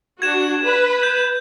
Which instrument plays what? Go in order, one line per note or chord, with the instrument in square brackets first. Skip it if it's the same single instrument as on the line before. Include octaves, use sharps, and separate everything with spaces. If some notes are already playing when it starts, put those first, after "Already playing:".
[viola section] D4 F#4 [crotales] G#6 E7
[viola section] B4
[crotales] G6